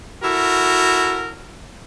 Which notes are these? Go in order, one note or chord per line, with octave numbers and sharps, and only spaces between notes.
E4 F#4 A4 A#4